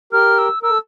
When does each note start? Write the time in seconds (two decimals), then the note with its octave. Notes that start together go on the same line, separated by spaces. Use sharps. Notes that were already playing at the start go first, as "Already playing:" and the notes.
0.13 G4 A#4 F6
0.38 E6
0.63 A#4 E6
0.71 A4